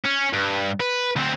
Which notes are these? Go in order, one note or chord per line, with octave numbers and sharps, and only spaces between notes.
C#4
G2
B4
D2 C4